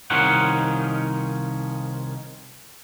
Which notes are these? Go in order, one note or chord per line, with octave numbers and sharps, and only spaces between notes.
C2 D#3 F3 C#4 D#4 F#5